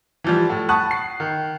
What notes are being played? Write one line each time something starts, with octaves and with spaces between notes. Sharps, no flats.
E3 F3 G3
A2
F#5 A5 B5 C#6 D#6 F#6
C7
D#3